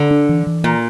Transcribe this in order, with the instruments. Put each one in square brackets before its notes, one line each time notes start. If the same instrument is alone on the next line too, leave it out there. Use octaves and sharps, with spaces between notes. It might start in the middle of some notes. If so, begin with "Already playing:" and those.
Already playing: [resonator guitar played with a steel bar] D3
[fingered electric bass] D4
E3
E3
[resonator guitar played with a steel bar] A#2 [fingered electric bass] A#3